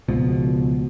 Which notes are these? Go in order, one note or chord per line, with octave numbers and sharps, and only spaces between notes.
C#2 B2 F3